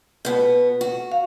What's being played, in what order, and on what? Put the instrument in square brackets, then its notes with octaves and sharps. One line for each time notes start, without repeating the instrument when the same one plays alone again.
[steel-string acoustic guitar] B2 B3
F#4
[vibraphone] F5